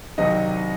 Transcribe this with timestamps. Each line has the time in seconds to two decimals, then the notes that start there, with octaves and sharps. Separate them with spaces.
0.18 C2 C3 D#3 F#3 D#5